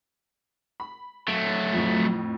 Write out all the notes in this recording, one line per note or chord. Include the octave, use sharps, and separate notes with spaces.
B5
F#3 A3 D7
F2 A2